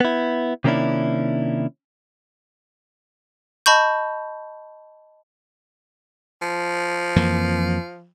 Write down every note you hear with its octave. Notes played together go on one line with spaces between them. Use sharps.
B3 E4
C3 D#3 A#3 C#4 D4 E4
D#5 A5 B5 C#6 G6
F3
F2 E3 A#3